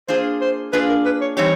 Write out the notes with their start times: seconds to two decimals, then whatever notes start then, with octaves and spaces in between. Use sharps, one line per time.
0.08 A#3 D4 F4 G#4 C5
0.41 C5
0.73 A#3 D4 F4 G#4 B4
0.89 A#4
1.05 B4
1.21 C#5
1.37 E3 G3 C4 D#4 G4 C#5